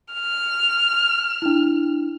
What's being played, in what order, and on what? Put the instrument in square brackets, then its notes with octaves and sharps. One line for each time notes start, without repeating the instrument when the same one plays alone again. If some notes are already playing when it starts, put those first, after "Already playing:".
[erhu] F6
[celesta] D4 E4